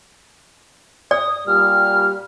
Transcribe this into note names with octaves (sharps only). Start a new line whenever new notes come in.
D5 D#6
A#2 G3 F6